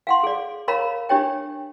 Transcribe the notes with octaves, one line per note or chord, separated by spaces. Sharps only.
F5 F#5 C6
G#4 D5
A#4 C#5 F5 A#5 B5
D4 G4 C#5 G5